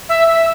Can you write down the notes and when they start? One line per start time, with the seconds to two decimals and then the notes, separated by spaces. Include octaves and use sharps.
0.09 E5
0.28 E5